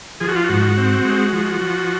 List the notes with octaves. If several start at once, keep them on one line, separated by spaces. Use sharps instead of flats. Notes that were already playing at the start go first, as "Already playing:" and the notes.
F3 G#4
F#4
F4
F#4
G#2
C4
G#3
F3
F3